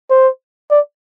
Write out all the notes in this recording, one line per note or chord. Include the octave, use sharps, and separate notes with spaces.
C5
D5